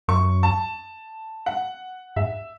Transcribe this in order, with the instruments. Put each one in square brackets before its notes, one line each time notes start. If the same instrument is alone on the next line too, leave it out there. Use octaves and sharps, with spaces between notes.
[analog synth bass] F#2 [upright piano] C#6
[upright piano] A5
F#5
[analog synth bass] G#2 [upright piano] E5